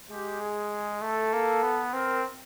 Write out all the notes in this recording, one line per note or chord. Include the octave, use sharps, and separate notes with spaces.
G#3 G4
G#4
A3 A4
A#3
B3
C4 A#4